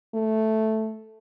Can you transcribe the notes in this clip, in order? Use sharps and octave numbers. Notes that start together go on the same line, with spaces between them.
A3